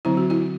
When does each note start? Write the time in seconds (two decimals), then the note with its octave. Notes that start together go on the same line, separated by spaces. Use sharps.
0.05 D3 F#3 C4 E4
0.17 F#4
0.30 E4